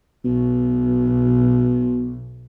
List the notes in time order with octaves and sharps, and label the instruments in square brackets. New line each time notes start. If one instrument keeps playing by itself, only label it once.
[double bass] B1 [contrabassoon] B2